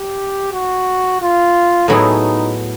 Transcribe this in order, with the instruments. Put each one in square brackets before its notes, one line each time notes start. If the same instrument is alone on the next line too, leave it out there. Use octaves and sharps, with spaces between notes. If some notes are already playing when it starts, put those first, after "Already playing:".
Already playing: [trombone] G4
F#4
F4
[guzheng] A2 F#3 B3 E4 G#4 [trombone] D#4